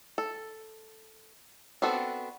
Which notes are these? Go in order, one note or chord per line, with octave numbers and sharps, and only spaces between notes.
A4
B3 C4 D4 F#4 A4